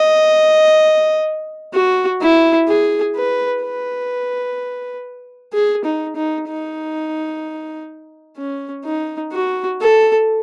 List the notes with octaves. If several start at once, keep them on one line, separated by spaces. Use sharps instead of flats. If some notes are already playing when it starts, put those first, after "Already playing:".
Already playing: D#5
F#4
E4
G#4
B4
B4
G#4
D#4
D#4
D#4
C#4
D#4
F#4
A4